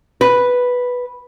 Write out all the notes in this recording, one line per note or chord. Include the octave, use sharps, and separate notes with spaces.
B4